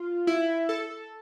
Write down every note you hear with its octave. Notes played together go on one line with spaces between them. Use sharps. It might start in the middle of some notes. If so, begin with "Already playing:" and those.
Already playing: F4
E4
A4